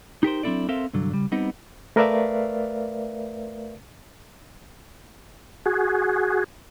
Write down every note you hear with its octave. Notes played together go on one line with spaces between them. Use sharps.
D#4 G4 A#4 C5
F#3 C4 D4 E4 A4 D5
C4 A4 A#4 C5 E5 F5
C2 G2 D3 F#3
C#3 G3
G3 B3 C4 D#4
A3 A#4 B4 D5 E5 F5
F#4 G#4